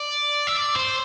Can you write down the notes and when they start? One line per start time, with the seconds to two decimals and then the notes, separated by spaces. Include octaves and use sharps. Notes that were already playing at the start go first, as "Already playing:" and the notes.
Already playing: D5
0.47 E5
0.57 D5
0.76 C5